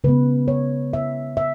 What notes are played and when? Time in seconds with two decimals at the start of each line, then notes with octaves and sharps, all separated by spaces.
0.04 C#3 G#3 B3 B4
0.48 C#5
0.93 E5
1.37 E5